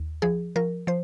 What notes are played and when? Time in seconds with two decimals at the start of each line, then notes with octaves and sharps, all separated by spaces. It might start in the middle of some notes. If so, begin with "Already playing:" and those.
Already playing: D#2
0.22 F3 G#4
0.56 F3 A#4
0.87 F3 C5